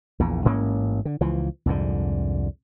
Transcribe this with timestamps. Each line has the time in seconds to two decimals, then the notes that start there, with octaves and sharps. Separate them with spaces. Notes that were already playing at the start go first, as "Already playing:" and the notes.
0.19 A#1 E2 A#2
0.45 A1 G#2 A#3 C#4
1.05 D3
1.21 C#2 E3 F3
1.66 C2 F2 G#2 D3